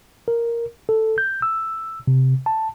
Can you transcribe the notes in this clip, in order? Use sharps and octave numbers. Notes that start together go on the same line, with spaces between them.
A#4
A4
G6
E6
C3
A5